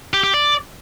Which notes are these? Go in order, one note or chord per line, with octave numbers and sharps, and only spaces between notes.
G4
G4
D5